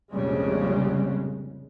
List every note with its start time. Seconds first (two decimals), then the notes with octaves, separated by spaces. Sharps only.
0.11 F1 A#1 F2 C#3 G3 G#3